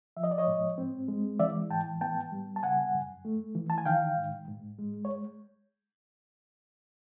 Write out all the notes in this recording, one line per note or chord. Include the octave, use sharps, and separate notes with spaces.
F3 E5
D#5
D5
C#5 D#5
G#2
C4
G#3
E3 D5 E5
G#2 G5 A5
B3 G5 A5
G3
A5
C#3 F#5 G#5
F#2
A3
E3
A5
G#5
D#3 F5 G5
G#2
G#2
G#3
C#5